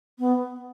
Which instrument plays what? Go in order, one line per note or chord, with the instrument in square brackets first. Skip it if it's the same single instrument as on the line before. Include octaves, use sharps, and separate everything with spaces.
[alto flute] B3